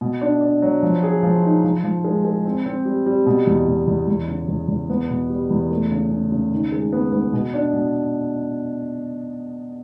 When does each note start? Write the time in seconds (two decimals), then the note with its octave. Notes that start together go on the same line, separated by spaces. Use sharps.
0.01 B2
0.21 D4
0.41 D4
0.62 F#3
0.83 F3
1.03 G#4
1.23 F3
1.43 D#4
1.64 F3
1.84 F3
2.04 G#3
2.25 G#3
2.45 C4
2.66 C4
2.85 G3
3.06 G3
3.26 B2
3.47 E2
3.67 B2
3.88 E2
4.08 E2
4.28 C#3
4.48 E2
4.68 E2
4.90 B3
5.09 B2
5.29 G3
5.50 E2
5.70 A3
5.91 C#3
6.11 C#3
6.32 C#3
6.52 D#3
6.72 G#3
6.92 B3
7.12 B3
7.33 B2
7.54 D4
7.74 B2